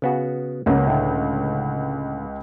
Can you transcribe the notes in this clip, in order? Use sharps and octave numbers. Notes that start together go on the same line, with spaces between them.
C#3 B3 F#4
C#2 A#3 B3 C#4 F#5
A2 D3